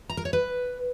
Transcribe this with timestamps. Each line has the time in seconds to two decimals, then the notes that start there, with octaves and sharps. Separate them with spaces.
0.10 A#5
0.17 A#4
0.25 C#5
0.33 B4